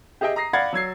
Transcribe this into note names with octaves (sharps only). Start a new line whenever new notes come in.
G4 G#4 D#5 E5 G5
A#5 D#6 A#6 C7
D5 F5 F#5 B5 G#6 A6
F#3 E6 G#6 C7